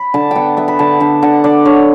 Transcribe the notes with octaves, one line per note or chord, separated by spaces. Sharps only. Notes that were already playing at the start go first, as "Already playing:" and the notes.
Already playing: B5
D3 A5
B3 F#5 G5
B3 E5
B5
D3 A5
D3 A5
D3 F#5
D3 D5
D3 C#5